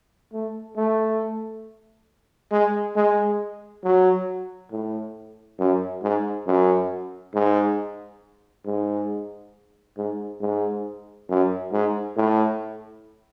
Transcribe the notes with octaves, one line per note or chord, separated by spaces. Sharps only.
A3
A3
G#3
G#3
F#3
A2
F#2
G#2
F#2
G#2
G#2
G#2
G#2
F#2
G#2
A2